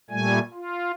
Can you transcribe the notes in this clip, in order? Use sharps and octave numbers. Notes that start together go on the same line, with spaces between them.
A#2 G3 A3 G#5
F4